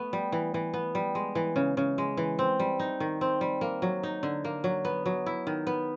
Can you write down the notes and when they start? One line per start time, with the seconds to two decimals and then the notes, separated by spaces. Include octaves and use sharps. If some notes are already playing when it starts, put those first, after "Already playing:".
Already playing: A3 B3
0.13 G3
0.32 E3
0.54 E3
0.74 B3
0.95 G3
1.15 G#3
1.35 E3
1.56 C#3
1.77 C#3
1.98 G#3
2.17 E3
2.39 C4
2.60 G3
2.80 D#4
3.00 D#3
3.21 C4
3.41 G3
3.61 A#3
3.82 F#3
4.03 D#4
4.23 D3
4.45 A#3
4.64 F#3
4.85 B3
5.06 F#3
5.26 E4
5.47 D#3
5.67 B3